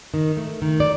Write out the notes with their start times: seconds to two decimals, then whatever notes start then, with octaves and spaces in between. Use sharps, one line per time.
0.14 D#3
0.37 A3
0.62 D#3
0.80 D5